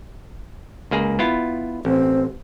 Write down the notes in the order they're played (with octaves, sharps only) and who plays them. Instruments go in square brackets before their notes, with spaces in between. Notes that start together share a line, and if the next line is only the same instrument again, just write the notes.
[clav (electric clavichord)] C#2 A#3 G#4
B3 E4 F4
[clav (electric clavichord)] A1 [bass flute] C4